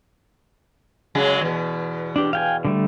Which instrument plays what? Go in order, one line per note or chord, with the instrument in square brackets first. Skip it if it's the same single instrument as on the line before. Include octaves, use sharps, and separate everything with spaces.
[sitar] C#3 F#3 G#3
E2 B2
[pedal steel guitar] D4 G4
F5 G5 G#5
D3 G3 A3